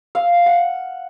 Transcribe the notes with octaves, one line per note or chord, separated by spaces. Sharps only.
F5
F#5